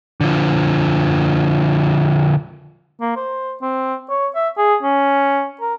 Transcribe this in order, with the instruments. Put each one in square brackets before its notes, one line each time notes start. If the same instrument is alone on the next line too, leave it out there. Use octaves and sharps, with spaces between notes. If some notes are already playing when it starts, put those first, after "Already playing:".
[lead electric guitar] D3 F3
[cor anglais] A#3
C5
C4
C#5
E5
G#4
C#4
A#4